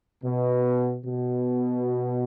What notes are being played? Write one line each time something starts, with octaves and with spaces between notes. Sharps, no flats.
B2
B2